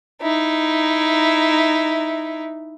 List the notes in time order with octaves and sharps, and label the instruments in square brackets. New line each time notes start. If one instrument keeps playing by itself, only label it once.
[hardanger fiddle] D#4 E4